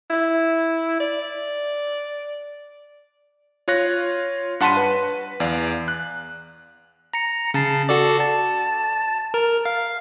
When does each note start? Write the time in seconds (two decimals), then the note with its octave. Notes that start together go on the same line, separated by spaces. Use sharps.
0.10 E4
1.00 D5
3.68 F4 C#5 F#6 A#6
4.60 G2 F#5 A5 C6 B6 D#7
4.77 B4
5.40 E2 D5 F5
5.88 F#6
7.13 A#5 C#7
7.54 C#3 A5 C7
7.89 F#4 A4 D5
8.20 A5
9.34 A#4
9.65 F5